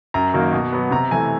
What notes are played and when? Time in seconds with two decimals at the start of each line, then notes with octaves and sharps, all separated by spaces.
0.14 F#2 A#5
0.34 D#3 F#3 A#3
0.52 B2
0.72 F#3 B3
0.91 C3 A#5
1.11 E3 A3 G#5